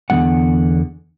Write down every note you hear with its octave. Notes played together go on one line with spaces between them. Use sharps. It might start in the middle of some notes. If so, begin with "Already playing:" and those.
E2 D3 G3 B3 F#5